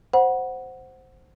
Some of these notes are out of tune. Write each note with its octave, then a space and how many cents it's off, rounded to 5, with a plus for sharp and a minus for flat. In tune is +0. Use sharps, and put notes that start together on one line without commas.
C5 +0 F#5 +0 B5 -35